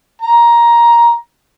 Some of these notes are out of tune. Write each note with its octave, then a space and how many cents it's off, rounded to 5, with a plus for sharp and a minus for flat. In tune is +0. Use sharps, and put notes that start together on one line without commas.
A#5 +15